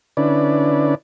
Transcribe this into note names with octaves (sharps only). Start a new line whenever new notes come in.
D3 C#4 D4 E4 B4 D5